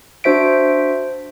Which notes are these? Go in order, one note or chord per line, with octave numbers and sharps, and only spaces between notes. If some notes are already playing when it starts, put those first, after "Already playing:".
D4 F#4 C5 E5 B6 D7